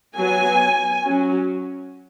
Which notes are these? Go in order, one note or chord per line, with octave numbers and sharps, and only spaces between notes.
F#3 B3 G#5
F#3 C#4